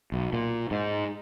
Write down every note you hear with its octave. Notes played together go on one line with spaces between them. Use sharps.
B1
A#2
G#2